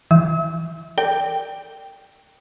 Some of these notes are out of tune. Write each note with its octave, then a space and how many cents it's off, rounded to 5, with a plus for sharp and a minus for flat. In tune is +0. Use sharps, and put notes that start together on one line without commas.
E3 +0 E6 -40
A#4 -45 D5 +0 G5 +0